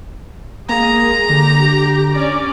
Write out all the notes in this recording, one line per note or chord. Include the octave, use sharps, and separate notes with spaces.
G#3 A#3 G#4 A#5
D3 G4
C#4 D5